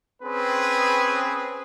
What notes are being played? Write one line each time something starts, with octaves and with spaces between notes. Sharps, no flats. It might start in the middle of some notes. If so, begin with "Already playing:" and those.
C4 C#4 G#4 B4